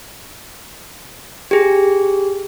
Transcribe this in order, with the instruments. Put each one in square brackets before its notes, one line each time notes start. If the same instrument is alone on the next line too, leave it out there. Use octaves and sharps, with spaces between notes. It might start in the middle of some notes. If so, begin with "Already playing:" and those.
[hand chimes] G4 G#4